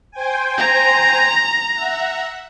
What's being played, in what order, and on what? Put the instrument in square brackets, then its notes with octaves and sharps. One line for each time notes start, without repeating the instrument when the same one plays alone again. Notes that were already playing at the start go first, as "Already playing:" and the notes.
[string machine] C5 G5 G#5
[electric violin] A#5
[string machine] E5 F#5